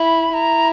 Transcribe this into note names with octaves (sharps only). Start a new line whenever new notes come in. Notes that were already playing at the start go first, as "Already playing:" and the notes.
Already playing: E4 B5
E4 A#5